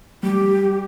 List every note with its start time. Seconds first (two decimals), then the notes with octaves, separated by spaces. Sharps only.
0.23 G3 G4